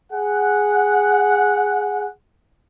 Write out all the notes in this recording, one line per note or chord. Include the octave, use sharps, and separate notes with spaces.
G#4 F#5